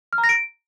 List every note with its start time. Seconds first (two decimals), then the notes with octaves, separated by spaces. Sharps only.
0.13 F6
0.18 A#5
0.24 A#6
0.29 D7